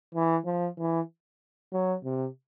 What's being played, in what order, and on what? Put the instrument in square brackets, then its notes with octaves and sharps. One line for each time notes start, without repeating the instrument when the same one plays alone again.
[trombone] E3
F3
E3
F#3
C3